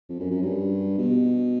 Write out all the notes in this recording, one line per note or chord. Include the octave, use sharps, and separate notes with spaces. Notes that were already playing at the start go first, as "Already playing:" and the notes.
F2
F#2
F#2
G2
B2